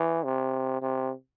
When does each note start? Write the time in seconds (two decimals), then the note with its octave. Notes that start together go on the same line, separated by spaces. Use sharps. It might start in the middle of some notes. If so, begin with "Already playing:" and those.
Already playing: E3
0.24 C3
0.82 C3